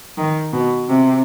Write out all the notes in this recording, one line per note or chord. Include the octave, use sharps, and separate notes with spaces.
D#3
B2
C3